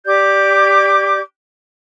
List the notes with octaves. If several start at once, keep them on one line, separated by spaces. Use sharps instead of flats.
G4 D5 D6 G6